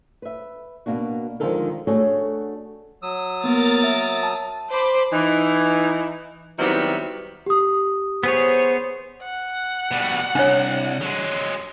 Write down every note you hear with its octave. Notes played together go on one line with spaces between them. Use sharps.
B4 E5
B2 A#3 D4 F#4
D3 D#3 F3 G#3 A4 A#4
A3 D4 F#4 G#4 A4 C#5
F#3 D#6 E6
A#3 B3 A#4 A6
E5
A5
C5 B5 D6
E3 D#4
D#3 F#3 G3 B3 C4 E4
G4 D#6
B3 G#4 C5 C#5
F#5
B2 G3
C2 D4 C#5
F#3 G#3